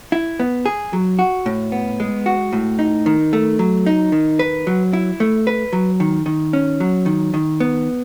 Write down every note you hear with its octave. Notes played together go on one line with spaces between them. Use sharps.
E4
B3
G#4
F#3
F#4
A2
B3
G#3
F#4
A2
D#4
D#3
A3
F#3
D#4
D#3
B4
F#3
E4
A3
B4
F#3
D#3
D#3
C#4
F#3
D#3
D#3
B3